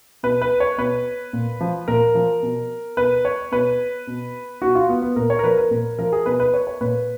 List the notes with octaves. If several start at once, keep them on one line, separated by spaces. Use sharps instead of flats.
B2 B4
B4
C#5
B2 B4
A#2
F3
A#2 A#4
F3
B2
B2 B4
C#5
B2 B4
B2
B2 F#4
F4
B3
B3
A#2 A#4
C#5
A#4
F3 B4
A#4
A#2 A#4
F3 A#4
G#4
B2 B4
B4
C#5
C#5
A#2 B4